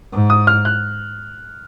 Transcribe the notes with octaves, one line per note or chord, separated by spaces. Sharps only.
G#2
D#6
F6
F#6